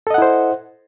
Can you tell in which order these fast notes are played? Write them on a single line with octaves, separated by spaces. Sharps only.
A4 D#5 F#5 E4 C5